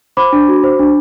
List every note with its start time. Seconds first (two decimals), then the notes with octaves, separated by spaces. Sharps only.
0.17 C5 B5 D6
0.33 D4
0.48 F#4
0.64 C5
0.79 D4